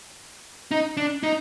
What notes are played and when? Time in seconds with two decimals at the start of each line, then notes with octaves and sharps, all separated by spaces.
0.71 D#4
0.97 D4
1.23 D#4